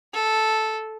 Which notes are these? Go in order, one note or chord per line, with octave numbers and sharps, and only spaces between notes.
A4